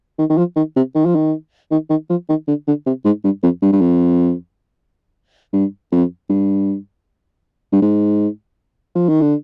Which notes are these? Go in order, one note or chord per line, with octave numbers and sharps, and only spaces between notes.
D#3
D#3
F3
D#3
C3
D#3
F3
D#3
D#3
D#3
F3
D#3
D3
D3
C3
G#2
G2
F2
G2
G2
F2
G2
F2
G2
G2
G#2
F3
D#3
D3